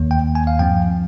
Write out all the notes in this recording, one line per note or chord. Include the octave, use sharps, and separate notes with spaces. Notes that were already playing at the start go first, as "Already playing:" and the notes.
Already playing: D#2 D#3 A#3
G5
G#5
F5
G2 F3 C4 G5